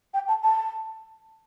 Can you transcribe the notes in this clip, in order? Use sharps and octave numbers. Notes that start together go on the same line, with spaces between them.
G5
A5
A5